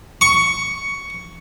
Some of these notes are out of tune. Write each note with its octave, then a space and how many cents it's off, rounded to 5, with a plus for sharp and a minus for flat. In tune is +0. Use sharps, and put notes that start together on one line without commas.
C#6 +10